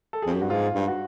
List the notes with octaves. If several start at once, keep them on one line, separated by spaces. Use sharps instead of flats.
A4
F2 G#4
F#2 G4
G2 F#4
G#2 F4
G2
F#4